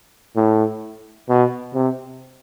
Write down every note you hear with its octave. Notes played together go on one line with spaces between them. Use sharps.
A2
B2
C3